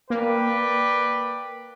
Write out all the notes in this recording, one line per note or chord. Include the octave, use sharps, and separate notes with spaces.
A#3 B4 D5 G5